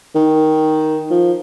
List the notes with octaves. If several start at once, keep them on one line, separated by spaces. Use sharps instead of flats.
D#3
F3